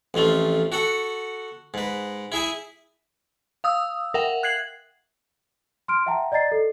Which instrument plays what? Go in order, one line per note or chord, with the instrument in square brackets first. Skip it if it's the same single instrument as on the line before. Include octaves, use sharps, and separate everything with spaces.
[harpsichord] A1 F2 A3 F4
F#4 A4 F#5
G#2 B4
E4 G#4 E5 G#5
[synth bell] F5 D#6 E6
A#4 E5 F#5 G5
F#6 G#6 C7 F#7
[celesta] C6 F6 D7
E5 F#5 G5 A5 A#5
D5 D#5 A#5 A6 C7
A4